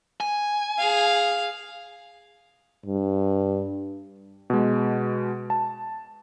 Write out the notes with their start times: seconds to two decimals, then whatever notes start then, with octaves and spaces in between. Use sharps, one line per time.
0.20 G#5
0.78 G#4 F5
2.86 G2
4.50 B2 G#3
5.50 A5